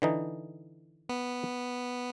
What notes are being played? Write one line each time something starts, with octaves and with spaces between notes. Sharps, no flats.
D3 E3 D#4
B3